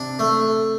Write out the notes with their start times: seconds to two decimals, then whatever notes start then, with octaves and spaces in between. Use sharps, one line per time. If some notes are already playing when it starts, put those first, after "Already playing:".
Already playing: C3 D4
0.19 A3